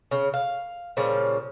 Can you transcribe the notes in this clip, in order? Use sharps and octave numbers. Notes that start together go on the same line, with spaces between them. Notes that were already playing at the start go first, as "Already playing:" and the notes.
C#3
F5
A#2 C#3 F3 G3